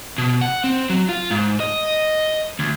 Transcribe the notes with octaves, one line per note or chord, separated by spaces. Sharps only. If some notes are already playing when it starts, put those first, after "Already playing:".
B2
F#5
C4
F#3
F4
G#2
D#5
D2